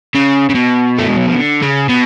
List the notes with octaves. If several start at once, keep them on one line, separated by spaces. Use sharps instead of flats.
C#3
C#3
B2
A3
G#3
F#3
F3
D3
C#3
B2